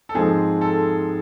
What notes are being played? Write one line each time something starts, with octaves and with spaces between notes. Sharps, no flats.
A4
G#2 F3 G#3 C4 G#4
A4